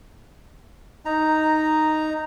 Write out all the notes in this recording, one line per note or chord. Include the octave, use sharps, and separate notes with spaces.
D#4 A#5